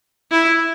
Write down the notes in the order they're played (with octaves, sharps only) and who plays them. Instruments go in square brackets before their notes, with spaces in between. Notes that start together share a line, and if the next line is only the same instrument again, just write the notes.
[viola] E4